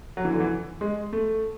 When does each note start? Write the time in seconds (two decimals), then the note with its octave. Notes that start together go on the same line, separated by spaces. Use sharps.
0.17 F#3
0.25 E3
0.32 D3
0.40 E3
0.81 G#3
1.13 A3